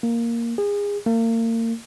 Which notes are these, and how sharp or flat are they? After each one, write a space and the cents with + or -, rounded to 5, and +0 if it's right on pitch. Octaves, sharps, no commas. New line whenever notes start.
A#3 +0
G#4 -30
A#3 -35